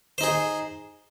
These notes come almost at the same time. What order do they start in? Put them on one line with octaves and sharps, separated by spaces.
C5 D#4 G#4